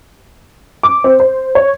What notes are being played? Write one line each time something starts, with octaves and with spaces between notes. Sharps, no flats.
D6
C4
C5
C#5